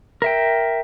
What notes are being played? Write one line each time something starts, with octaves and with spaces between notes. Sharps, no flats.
A#4 E5 G5